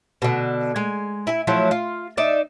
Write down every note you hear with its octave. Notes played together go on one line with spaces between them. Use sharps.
B2 D3
G#3 G#5
E4 G#5
F3 F#3 A3 E4
F4
D#4 D5 E5